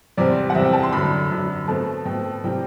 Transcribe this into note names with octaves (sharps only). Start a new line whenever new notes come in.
E2 C3 G3 C4 D5
C5
F#5
E2 C3 G3 C4 E5
G5
A5
C6
F#2 D3 F#3 B5
F#2 D3 F#3
B2 A3 C4 A5
B2 A3 C4 G5
C3 E3 G3 G5